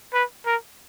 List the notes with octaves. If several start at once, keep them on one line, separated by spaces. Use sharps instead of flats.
B4
A#4